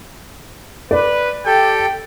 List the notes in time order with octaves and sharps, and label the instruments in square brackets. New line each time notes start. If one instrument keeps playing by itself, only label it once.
[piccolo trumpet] B4 [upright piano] D5
[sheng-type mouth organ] G4 A4 [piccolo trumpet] G5